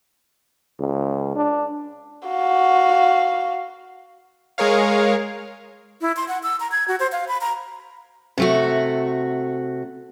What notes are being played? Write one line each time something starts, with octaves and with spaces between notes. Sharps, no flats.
C#2
D4
F#4 F5
G#3 G#4 A#4 C#5 F5
E4
C6
F#5
E6
A#5
G#6
F#4
C5
F5
B5
A#5
C3 A3 F#4